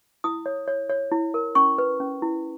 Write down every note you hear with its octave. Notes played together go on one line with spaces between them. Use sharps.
E4 D#6
C#5
C#5
C#5
E4
A#4
C#4 C#6
B4
C#4
E4